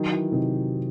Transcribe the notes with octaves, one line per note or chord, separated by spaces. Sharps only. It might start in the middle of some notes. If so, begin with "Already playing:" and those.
Already playing: D#3 F#3
E3
C3 D#3